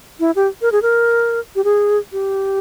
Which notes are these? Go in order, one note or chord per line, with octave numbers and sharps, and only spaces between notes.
E4
G4
A#4
G#4
A#4
G4
G#4
G4